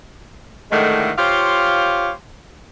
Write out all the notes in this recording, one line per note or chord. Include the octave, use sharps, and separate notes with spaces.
A2 D3 D#3 G#3 A3
F4 G4 C5 C#5 F5